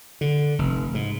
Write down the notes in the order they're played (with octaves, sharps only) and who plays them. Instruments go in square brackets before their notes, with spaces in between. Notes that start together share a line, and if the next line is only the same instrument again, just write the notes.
[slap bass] D3
F1
G#2